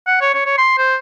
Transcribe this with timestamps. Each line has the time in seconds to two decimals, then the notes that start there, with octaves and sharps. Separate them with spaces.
0.07 F#5
0.21 C#5
0.34 C#5
0.46 C#5
0.58 C6
0.78 C5